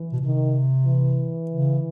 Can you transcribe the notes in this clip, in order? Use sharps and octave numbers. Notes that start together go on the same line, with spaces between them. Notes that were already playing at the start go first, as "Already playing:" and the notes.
Already playing: E3
B2
C3 D#3
E3
C#3